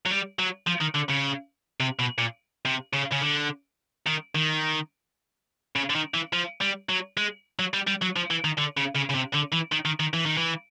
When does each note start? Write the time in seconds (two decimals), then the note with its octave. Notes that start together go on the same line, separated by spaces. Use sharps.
0.06 F#3
0.11 G3
0.39 F#3
0.67 F3
0.81 D#3
0.95 D3
1.10 C#3
1.80 C3
1.99 B2
2.18 A#2
2.65 C3
2.93 C#3
3.12 C#3
3.21 D3
4.06 D#3
4.35 D#3
5.76 C#3
5.90 D3
5.95 D#3
6.14 E3
6.33 F3
6.61 G3
6.89 F#3
7.17 G#3
7.59 F#3
7.74 G3
7.87 G3
8.02 F#3
8.16 F3
8.31 E3
8.45 D#3
8.58 D3
8.77 C#3
8.96 C#3
9.10 C#3
9.15 C3
9.34 D3
9.53 E3
9.72 D#3
9.85 D#3
10.00 D#3
10.14 E3
10.26 D#3
10.37 E3